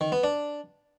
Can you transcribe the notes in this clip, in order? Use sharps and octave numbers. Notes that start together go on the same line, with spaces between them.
D#3
B3
D4